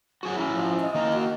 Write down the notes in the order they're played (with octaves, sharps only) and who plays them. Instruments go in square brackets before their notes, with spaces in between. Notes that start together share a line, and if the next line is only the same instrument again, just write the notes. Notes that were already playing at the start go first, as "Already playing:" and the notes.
[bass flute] F#3 [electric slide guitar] F#4 G#4 F#5
[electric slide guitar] C#4 E4
[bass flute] F3
D#5
[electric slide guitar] D#3 A#3 D#4
[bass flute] F#4